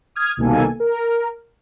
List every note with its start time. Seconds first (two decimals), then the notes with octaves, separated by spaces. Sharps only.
0.16 D#6 F6 G#6
0.37 C2 B2 D#3 A#3 A4 G#5
0.80 A#4